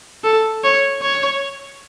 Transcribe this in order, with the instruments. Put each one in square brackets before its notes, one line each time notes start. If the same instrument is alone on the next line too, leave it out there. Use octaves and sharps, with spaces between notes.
[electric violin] A4
C#5
C#5